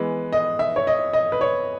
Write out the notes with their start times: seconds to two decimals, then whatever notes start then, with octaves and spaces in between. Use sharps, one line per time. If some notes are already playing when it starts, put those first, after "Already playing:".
Already playing: E3 G#3 B3 B4
0.33 D#5
0.59 E5
0.76 C#5
0.87 D#5
1.13 D#5
1.32 B4
1.41 C#5